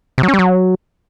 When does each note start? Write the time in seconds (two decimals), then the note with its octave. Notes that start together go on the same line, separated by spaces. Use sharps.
0.18 C3
0.23 F#3
0.28 C#4
0.34 G3
0.39 F#3